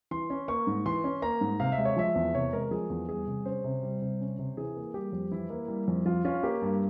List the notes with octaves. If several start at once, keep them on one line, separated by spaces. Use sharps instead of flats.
E3 C6
C#4
A#3 C#6
G#2
E3 C6
C#4
A#3 A#5
G#2
C3 F5
E5
G#3
C#5
F3 E5
E2
C3 C#5
G#3 A#4
F3 G#4
E2
G3 G#4
C3
C#4 C5
C3
G3
C3
C#4
C3
E3 G#4
A#3
G3 G4
F2
E3 E4
A#3
G3
F2
F3 F4
C#4 F4
A#3 G4
G2